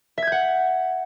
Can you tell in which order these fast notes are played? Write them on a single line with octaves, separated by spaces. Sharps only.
E5 G#6 G6 F#5